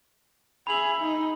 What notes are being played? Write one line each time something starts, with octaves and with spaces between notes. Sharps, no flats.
G#4 E5 B5 F#7
D#4